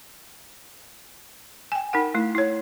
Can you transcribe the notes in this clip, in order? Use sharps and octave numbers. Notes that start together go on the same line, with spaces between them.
G5 G#5
D#4 A#4 F#5
A3 E4
E4 C#5